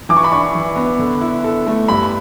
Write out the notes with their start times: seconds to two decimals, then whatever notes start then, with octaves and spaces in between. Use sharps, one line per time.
0.09 E3 D6
0.17 C#6
0.24 B5
0.31 D4 C#6
0.55 E3
0.76 B3
0.99 D3
1.21 E4
1.44 A4
1.67 A3
1.88 G2 B5